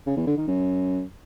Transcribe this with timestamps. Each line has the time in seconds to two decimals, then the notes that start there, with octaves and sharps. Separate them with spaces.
0.06 C#3
0.17 E2
0.27 D3
0.37 D#3
0.47 F#2